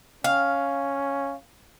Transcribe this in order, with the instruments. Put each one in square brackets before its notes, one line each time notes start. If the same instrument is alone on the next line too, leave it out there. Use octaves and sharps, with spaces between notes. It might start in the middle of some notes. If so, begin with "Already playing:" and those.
[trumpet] C#4 [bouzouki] F5